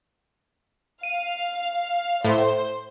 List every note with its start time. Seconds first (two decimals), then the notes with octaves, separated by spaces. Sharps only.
1.03 F5 D#7
2.24 A2 C5